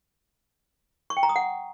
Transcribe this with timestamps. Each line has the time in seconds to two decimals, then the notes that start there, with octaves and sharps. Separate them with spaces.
1.10 C#6
1.17 G5
1.23 A#5
1.29 D#6
1.36 F#5